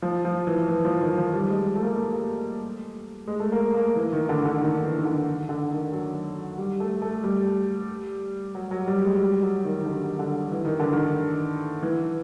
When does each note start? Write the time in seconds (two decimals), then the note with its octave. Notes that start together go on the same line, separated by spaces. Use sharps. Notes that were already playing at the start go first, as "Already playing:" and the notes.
0.02 F3
0.25 F3
0.47 E3
0.68 E3
0.85 F3
1.01 D#3
1.18 F3
1.33 G3
1.50 G#3
1.75 A3
1.83 A#3
1.99 A3
3.27 G#3
3.40 A3
3.52 A#3
3.74 A#3
3.96 E3
4.13 D#3
4.29 D3
4.45 D3
4.61 D#3
4.83 E3
4.99 D#3
5.05 D3
5.49 D3
5.71 D#3
5.93 F#3
6.58 G3
6.80 A3
7.02 A3
7.24 G3
8.55 F#3
8.71 F#3
8.87 G3
9.05 G#3
9.21 G3
9.42 F#3
9.64 D#3
9.81 D#3
9.86 D3
10.19 D3
10.51 E3
10.65 D#3
10.80 D3
10.93 D#3
11.83 E3